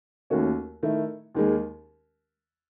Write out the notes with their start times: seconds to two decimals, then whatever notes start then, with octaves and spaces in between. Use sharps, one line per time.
0.30 D#2 D#3 A3 C#4 F#4
0.83 D#3 A3 E4
1.35 D#2 D#3 G#3